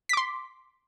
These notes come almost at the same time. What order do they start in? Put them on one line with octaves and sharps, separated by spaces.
B6 D6 C6